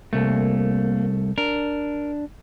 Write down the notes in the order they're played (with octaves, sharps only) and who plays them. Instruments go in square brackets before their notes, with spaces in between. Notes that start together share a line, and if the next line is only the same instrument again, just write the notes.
[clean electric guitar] C2 A3 [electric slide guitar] A#3
[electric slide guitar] D4 [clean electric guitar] A#4